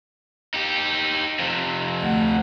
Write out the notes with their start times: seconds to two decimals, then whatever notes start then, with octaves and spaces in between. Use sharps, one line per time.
0.54 D#4 G4
1.39 F2 C3
2.00 D2 F#5